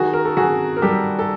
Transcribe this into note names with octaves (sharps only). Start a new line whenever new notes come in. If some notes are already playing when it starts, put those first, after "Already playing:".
Already playing: D#3 F#4 G#4
A#4
A4
D#3 F#4 G#4
A#4
G3 G4 A4
A4